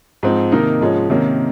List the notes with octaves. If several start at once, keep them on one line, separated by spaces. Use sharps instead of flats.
G#2 F3 C4
C3 D#3 A#3 D#4 A#4
G#2 F3 G#3 C#4
C3 D#3 A#3 C#4